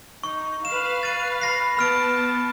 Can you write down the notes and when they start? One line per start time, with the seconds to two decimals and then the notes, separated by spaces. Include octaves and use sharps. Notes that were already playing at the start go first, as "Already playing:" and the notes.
0.24 D#4 C#6
0.65 B4 F5 E7
1.03 A6 D#7
1.41 B5 A#6 C7
1.77 B3 A5 B5 F6 D7